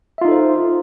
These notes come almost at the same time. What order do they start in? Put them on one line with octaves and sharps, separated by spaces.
E5 F4 D#4 A4 C5